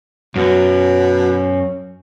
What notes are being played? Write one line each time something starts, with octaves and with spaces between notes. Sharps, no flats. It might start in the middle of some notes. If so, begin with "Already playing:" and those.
F#2 B2